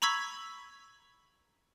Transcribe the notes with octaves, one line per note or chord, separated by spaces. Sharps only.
A#5 B5 C#6 E6 G#6 B6